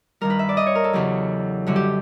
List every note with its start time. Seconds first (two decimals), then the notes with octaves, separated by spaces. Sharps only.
0.21 G2 D#3 G3 A#4
0.30 B4
0.39 E5
0.49 D5
0.57 D#5
0.66 C#5
0.75 A#4
0.84 A4
0.93 E2 C#3 F#3 G4
1.67 F#2 D3 G3 F#4
1.76 G4